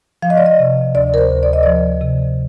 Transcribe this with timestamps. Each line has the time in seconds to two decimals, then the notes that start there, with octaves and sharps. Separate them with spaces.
0.22 F3 F5
0.30 D#5
0.37 D5
0.46 D#5
0.59 C3
0.95 D2 D5
1.14 A#4
1.18 C5
1.31 D2
1.43 D5
1.53 D#5
1.63 F3 D5
2.01 C3